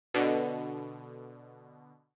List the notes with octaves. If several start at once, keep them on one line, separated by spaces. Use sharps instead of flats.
B2 D3